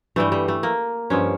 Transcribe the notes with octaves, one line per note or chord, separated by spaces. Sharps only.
G2 E3 G3 A3
G3
A3
A#3
G2 F3 C#4